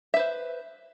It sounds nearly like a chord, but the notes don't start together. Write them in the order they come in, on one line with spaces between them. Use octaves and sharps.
E5 B4 C5